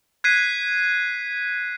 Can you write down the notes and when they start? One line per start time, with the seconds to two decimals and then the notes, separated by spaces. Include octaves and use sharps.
0.24 F#6 G#6 B6 C7 D#7